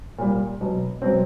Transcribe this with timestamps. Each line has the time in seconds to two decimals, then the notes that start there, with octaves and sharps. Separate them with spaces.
0.19 A#2 G3
0.61 B2 F#3
1.02 B2 F#3 C4